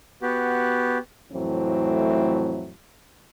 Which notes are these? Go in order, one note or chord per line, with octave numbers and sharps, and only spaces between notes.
B3 F#4 G4
F2 A2 E3 F#3 A3 C4